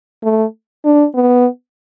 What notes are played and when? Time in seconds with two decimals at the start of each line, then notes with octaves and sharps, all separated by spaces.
0.24 A3
0.85 D4
1.15 B3